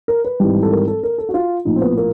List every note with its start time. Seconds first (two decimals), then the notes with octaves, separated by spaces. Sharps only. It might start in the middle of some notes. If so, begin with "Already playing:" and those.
0.08 A#4
0.25 B4
0.40 G#1 G#2 E3 G3
0.63 A4
0.71 A#4
0.88 A4
1.03 A#4
1.18 A4
1.29 F#4
1.34 F4
1.65 A#1 A2 F3 D#4
1.76 C4
1.82 B3
1.98 A#3